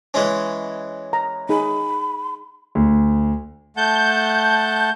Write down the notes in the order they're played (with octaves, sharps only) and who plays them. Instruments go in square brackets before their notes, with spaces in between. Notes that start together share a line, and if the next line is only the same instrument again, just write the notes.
[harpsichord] E3 G#3 C#4
[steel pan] A#5
[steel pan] D#4 G#4 [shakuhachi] B5
[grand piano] D2
[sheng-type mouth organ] A3 F#5 A5 [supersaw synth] G6